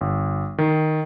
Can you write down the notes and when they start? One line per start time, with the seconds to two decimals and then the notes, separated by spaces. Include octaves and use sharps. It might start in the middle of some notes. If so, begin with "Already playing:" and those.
0.01 G1
0.58 D#3